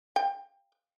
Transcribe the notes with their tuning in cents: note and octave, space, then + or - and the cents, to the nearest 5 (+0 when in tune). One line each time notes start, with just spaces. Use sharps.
G5 +20